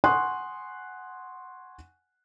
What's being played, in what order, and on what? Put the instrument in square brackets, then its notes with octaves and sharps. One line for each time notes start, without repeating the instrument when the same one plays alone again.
[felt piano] F#5 G#5 C6 C#6 D#6 F#6